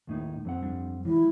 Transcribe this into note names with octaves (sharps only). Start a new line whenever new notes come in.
D#2 A2 D#4
F2 C4 F#5
G3 D4
E3 F3 G#3 E4